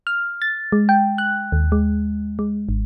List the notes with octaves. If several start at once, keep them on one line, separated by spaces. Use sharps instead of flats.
F6
A6
G#3
G5
F#6
D#2
G#3
G#3
G#1